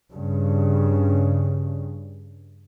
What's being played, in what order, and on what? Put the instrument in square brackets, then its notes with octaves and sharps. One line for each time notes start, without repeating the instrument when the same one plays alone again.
[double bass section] G2 C#3